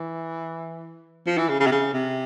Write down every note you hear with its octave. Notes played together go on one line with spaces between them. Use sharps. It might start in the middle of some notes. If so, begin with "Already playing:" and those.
Already playing: E3
F3
E3
C#3
C#3
C3
C#3
C3